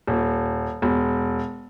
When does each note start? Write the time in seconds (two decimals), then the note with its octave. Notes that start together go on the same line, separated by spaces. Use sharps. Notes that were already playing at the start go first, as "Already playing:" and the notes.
0.07 D#1
0.82 E1